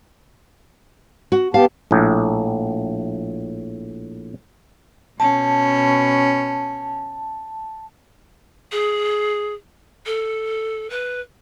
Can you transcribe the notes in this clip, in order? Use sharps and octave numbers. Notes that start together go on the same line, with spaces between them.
F#4
B3 G4 F5 A5
A#1 A2
B2 C#4 A5
G#4
A4
B4